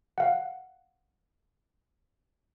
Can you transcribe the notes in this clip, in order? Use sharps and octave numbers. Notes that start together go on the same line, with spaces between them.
F5 F#5